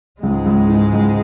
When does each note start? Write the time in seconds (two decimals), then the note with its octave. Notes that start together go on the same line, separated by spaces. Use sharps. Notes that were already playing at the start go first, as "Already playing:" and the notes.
0.23 C#2 G#2 G#3
0.46 C#2
0.69 E3
0.93 C#2